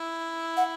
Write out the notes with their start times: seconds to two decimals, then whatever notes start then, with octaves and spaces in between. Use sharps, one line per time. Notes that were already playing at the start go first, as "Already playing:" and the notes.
Already playing: E4
0.57 F#5